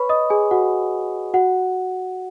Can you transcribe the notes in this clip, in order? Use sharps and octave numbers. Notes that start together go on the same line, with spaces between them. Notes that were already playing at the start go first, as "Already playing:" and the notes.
Already playing: B4 C#5 B5 C#6
D#5 D#6
G#4 G#5
F#4 F#5
F#4 F#5